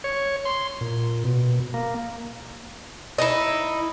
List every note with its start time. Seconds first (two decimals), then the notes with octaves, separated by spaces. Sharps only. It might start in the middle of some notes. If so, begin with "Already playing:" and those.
0.04 C#5
0.45 C6
0.81 A#2
1.25 B2
1.74 A#3
3.18 D#4 E4